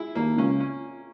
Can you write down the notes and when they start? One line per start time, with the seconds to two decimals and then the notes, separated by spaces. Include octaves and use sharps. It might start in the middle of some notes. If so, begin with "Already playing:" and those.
Already playing: G#3 E4
0.15 D#2 D#3 A#3
0.38 C#2 C#3 C#4
0.60 C#4